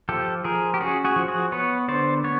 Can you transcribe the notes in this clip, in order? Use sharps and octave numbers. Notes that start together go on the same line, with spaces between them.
F3 G4 A4
F3 G#4 A#4
G4
C#4 F#4 G#4
F#4 G#4
F3
F#4 G#4
B3 B4 C#5
D3 C5 D5
B3 C#5